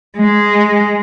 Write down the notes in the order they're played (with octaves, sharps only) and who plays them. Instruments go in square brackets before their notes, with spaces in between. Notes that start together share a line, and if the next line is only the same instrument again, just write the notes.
[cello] G#3